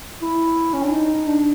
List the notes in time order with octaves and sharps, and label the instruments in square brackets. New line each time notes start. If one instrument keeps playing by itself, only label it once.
[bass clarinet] E4
C#4
D4
D#4
D4